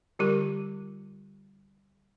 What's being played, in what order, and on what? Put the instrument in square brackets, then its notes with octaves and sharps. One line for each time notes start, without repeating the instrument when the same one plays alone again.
[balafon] D3 G3 F4 G4 A#4